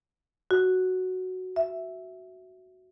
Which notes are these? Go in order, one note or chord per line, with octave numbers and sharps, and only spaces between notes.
F#4
E5